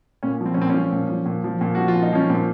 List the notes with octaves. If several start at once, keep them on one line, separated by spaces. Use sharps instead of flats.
A#2 C#4
F3
C4
C#4
A#2 C4
F3 C#4
A#2
F3
A#2
F3
A#2
F3 F#4
F4
A#2
D#4
F3 C#4
A#2 C4